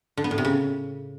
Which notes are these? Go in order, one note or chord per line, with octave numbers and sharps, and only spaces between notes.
D3
B3
A2
C3
C#3